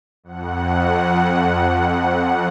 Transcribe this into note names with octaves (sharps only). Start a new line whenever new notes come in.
F2 F#5